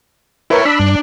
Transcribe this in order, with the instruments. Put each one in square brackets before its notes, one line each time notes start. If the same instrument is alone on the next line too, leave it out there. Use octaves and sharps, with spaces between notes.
[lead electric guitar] E4 C#5 [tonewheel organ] A#4 B4
[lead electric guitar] D4 [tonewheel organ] B5 E6
[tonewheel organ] G2